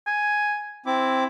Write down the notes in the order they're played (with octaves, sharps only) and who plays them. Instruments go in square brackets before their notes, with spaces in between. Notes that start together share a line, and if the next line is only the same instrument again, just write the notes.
[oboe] G#5
[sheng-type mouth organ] C4 D6 [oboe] E4